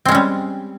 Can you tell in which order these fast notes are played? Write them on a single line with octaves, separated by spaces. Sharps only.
C4 G#3 C#4 G3